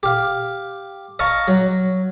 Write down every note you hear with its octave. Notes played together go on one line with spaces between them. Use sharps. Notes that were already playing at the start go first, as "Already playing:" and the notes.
G4 F5
D#5 F5 A5 A#5 C#6
F#3